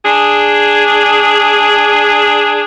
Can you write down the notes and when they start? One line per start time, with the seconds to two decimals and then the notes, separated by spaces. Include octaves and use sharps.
0.06 D4 G#4